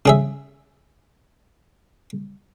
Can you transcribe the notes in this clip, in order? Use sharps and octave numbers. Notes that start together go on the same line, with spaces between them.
C#3 G#4 E5